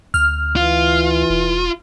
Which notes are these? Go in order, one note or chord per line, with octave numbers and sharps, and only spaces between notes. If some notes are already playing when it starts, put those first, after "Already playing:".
D2 F6
E3 F4
E1